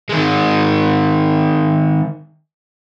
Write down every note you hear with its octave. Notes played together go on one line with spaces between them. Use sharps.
D#3 G#3